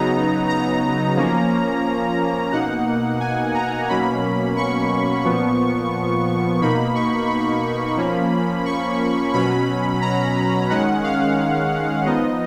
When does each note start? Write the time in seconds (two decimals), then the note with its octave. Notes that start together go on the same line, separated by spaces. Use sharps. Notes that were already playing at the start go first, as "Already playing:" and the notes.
Already playing: C#3 F#3 B3 D#4 A#5
0.48 A#5
1.16 F3 A#3 C#4
2.52 B2 A#3 D#4 F#5
3.20 G#5
3.54 A#5
3.89 B2 F#3 A#3 C#4 B5
4.57 C#6
5.25 A#2 F3 B3
6.61 B2 A#3 D#4 B5
6.95 C#6
7.29 B5
7.97 F3 A#3 C#4
8.65 C#6
9.33 B2 F#3 C#4 B5
10.01 A#5
10.70 D#3 G#3 C#4 F#5
11.04 F5
12.05 F3 B3 D#4 D#5